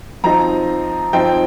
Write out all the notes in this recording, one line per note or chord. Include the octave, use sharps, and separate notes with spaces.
F3 C4 D#4 A#5
F3 C4 D#4 G5